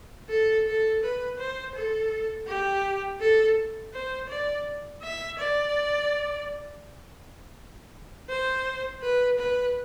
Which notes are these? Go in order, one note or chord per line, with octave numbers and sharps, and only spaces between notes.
A4
A4
B4
C5
A4
G4
A4
C5
D5
E5
D5
C5
B4
B4